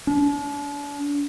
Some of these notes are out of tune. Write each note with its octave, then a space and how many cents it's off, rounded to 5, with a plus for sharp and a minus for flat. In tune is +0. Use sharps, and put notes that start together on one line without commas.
D4 -40